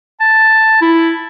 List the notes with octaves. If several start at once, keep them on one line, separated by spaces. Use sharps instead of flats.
A5
E4